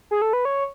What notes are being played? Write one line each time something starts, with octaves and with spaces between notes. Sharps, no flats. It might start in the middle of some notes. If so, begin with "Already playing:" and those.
G#4
A4
B4
C#5